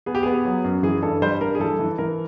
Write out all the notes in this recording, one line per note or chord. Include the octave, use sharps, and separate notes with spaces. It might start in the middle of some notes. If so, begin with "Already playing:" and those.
B3 G#4
G4
B3 G#4
F#3
F#2
E3 G#4
G2 A4
G3 C5
G2 A#4
G#4
E3 A4
E3
E3 A#4